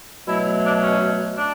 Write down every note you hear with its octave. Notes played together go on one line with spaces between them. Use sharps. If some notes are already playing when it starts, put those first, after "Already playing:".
B2 F#3 A3 E4
D4
C#4
D4